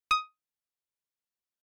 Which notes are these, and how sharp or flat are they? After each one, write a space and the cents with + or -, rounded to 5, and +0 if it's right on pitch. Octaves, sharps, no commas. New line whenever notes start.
D#6 +10